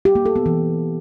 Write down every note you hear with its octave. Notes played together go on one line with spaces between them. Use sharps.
G4
A#3
A4
B3
E3